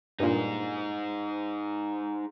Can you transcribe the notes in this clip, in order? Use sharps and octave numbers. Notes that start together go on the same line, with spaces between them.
G2 A#2 D#4 G#4